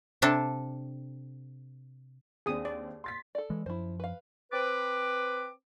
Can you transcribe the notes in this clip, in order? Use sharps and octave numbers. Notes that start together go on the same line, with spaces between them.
C3 D4 A4
D#2 C4 D4 G#4 D#6
D5
C6 A6 B6
A4 D5
E3 G#3
F#2 F3 E4 C5
B4 F5
C4 B4 D6